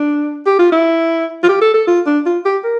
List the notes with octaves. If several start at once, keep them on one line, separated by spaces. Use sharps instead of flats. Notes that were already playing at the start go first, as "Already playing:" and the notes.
Already playing: D4
G4
F4
E4
F4
G4
A4
A4
F4
D4
F4
G4
A#4